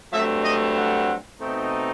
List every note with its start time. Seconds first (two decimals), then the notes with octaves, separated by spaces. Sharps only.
0.13 G2 F#3 A3 C4 E5
0.44 D#5
0.76 F#5
1.40 B2 A3 C4 D#4